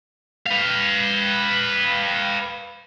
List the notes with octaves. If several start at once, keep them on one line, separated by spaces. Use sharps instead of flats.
B4 F5